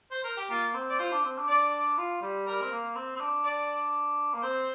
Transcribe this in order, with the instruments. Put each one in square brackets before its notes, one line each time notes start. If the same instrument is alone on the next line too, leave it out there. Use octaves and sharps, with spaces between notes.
[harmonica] C5
A#4
G4
[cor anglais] A#3 [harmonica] F4
[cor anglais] C4
[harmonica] D5
[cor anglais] F4 [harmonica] C5
[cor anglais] D4
C4
D4
[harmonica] D5
[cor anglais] F4
G3
[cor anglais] G3 [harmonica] A#4
[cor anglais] C4
A#3
C4
C4
D4
[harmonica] D5
[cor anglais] A#3
[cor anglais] C4 [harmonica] C5